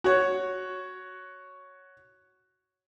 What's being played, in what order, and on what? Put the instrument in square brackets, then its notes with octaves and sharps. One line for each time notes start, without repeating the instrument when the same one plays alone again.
[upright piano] F#4 C#5